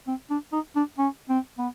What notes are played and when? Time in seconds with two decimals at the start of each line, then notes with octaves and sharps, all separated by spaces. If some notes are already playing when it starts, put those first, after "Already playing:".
0.08 C4
0.30 D4
0.52 D#4
0.76 D4
0.99 C#4
1.29 C4
1.59 B3